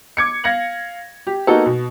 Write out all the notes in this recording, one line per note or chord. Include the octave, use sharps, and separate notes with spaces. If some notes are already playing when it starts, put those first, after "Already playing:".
D6 G#6 C#7
F5 G#6 A#6 C#7 F#7
G4
A#3 B3 D#4 F#4 A4
B2